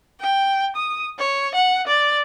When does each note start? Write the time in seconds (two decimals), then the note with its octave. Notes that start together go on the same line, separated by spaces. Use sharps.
0.20 G5
0.76 D#6
1.19 C#5
1.55 F#5
1.87 D5